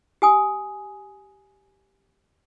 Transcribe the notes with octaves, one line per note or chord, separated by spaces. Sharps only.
G4 G#5 D#6